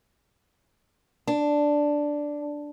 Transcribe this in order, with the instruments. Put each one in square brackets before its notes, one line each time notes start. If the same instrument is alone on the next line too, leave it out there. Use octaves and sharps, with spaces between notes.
[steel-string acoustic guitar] D4